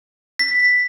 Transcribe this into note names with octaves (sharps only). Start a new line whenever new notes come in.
B6